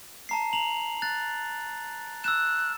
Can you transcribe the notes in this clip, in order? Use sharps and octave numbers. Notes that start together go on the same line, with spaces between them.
A5 A#5 C7
A#5 F7 F#7
F#6 A6
E6 F#6 E7